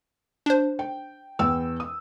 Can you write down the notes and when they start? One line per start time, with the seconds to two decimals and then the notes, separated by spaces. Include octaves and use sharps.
0.46 D4 C5
0.79 G5
1.39 E2 G5 E6
1.80 D#6